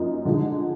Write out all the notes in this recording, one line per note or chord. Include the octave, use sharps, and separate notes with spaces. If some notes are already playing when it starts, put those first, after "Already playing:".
Already playing: F#2 F3 A#3 D#4
D3 F3 G#3 D#4 G#4